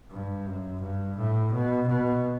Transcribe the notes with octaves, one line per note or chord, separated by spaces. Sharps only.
G2
F#2
G2
A2
B2
B2